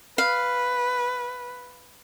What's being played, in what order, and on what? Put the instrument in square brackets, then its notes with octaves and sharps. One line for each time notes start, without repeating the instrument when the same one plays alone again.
[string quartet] B4 [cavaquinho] F5